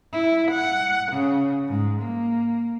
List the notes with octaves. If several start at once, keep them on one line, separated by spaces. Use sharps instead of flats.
E4
F#5
C#3
G#2
A#3